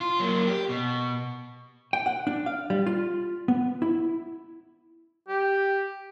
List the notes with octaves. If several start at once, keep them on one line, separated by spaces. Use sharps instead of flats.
F4
F#3 A#3
G4
B2
G5
F#5
D4
F5
G3
F4
B3
E4
G4